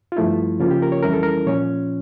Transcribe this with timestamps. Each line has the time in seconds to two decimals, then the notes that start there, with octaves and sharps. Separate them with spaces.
0.12 F4
0.17 G2 F3 A3 E4
0.60 C#3 F3 A#3 C#4 F4
0.71 G4
0.82 A#4
0.92 C#5
1.03 F2 E3 G3 C#4 E4 A#4
1.13 A4
1.23 A#4
1.46 A#2 F3 C#4 C#5